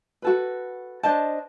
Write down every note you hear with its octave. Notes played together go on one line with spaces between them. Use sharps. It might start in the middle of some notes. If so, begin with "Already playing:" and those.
F#4 A4 B4
D4 C5 D#5 A5